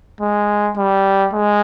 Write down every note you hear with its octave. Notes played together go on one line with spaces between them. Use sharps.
G#3
G3
G#3